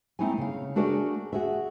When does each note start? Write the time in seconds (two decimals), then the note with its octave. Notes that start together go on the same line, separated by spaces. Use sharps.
0.19 A3 C4 D#4 E4 C#5 G#5
0.38 C#3 F5
0.76 A3 D4 F#4 G#4 A#4 D5
1.33 F#4 G#4 E5